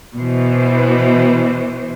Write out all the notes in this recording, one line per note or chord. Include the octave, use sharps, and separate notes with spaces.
B2 E3 C5